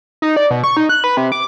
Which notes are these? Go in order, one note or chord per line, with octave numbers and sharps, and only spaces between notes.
D#4
D5
B2
C#6
D#4
F#6
B4
C3
D6